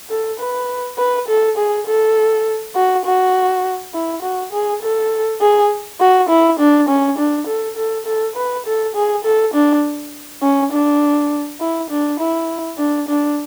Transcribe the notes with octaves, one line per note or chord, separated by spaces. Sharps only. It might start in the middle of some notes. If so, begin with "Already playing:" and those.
A4
B4
B4
A4
G#4
A4
F#4
F#4
E4
F#4
G#4
A4
G#4
F#4
E4
D4
C#4
D4
A4
A4
A4
B4
A4
G#4
A4
D4
C#4
D4
E4
D4
E4
D4
D4